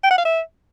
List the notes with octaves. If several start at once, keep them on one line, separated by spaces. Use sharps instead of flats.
G5
F#5
F5
E5